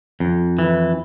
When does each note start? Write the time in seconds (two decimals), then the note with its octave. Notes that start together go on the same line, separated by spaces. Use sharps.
0.20 F2
0.59 E3